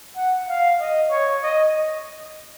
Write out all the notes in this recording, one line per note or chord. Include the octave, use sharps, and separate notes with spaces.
F#5
F5
D#5
C#5
D#5